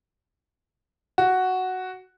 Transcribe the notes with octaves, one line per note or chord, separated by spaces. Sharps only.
F#4